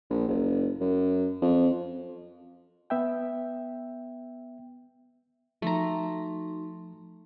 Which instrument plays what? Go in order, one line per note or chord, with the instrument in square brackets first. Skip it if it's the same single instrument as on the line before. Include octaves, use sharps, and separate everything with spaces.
[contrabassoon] A#1
F#1
F#2
F2
[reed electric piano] B3 E5 G5
[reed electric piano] F3 [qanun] A3 A#5 [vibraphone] D#4 F#4 C6